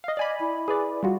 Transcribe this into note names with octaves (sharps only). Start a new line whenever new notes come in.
D#5 F5
D5 D#5 G#5 B5
E4
G#4 B4 D5
G3 F4 F#4